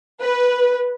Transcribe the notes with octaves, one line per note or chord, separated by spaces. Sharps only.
B4